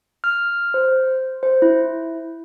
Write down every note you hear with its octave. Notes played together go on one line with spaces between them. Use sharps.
F6
C5
C5
E4